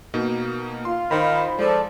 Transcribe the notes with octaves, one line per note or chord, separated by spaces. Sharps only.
B2 A#3 D#4
F4 C6
D#3 D#4 C5 B5
F3 G#3 A4 D5